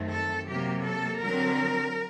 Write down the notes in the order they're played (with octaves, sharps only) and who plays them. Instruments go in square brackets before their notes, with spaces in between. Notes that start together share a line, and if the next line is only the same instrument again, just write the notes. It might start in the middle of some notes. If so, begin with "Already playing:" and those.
Already playing: [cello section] F#2 D#3 A3 C4
A4
C3 F#3 A#3 G4
A4
D3 F#3 C4 A#4